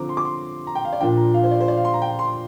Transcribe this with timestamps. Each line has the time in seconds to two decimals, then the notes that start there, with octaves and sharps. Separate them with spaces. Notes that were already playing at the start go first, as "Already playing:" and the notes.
Already playing: D3 F3 C4 A#5 D6
0.09 C6
0.17 D6
0.25 C6
0.67 A#5
0.75 G5
0.85 F5
0.93 D5
1.00 A#2 F3 D4 G5
1.17 A#5
1.34 F5
1.44 C5
1.51 D5
1.60 C5
1.68 D5
1.77 F5
1.85 C6
1.94 A#5
2.02 G5
2.19 C6